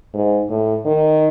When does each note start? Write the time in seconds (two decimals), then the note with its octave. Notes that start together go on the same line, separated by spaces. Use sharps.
0.14 G#2
0.49 A2
0.86 D#3